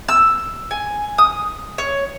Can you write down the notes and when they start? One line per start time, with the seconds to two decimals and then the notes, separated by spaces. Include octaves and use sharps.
0.09 E6
0.71 G#5
1.18 D#6
1.78 C#5